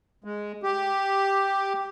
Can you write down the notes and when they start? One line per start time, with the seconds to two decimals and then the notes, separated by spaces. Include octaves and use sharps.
0.24 G#3
0.63 G4